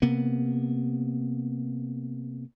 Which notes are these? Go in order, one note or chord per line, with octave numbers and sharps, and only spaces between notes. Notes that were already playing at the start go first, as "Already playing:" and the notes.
C3 A#3 B3